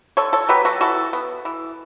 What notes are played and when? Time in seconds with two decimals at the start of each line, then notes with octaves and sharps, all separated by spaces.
0.17 D3 A4 C#5
0.33 A4 C#5
0.49 F#3 B3 G4 B4
0.65 F#4 A4
0.81 E3 F#4 A4
1.13 B3
1.45 E3